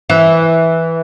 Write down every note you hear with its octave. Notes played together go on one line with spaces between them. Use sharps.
E3